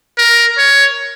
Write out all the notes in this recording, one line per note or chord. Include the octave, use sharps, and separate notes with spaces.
A#4
C#5